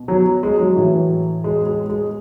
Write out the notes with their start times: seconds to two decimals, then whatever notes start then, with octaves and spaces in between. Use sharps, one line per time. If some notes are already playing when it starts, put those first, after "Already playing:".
Already playing: B2
0.08 F#3
0.43 G#3
0.59 F#3
0.76 A2 E3
1.44 G#3
1.67 G#3
1.90 G#3